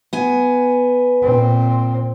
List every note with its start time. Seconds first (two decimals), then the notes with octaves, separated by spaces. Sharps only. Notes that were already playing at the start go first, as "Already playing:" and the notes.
0.13 B3 G#5
1.22 A#2 C4